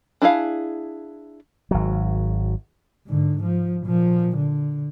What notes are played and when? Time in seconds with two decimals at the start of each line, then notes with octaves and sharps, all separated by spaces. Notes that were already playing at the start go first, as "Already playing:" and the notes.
0.22 D4 E4 G#4 F5
1.71 G#1 F#3
3.06 G#2 D3
3.43 F3
3.86 A#2 F3
4.37 D3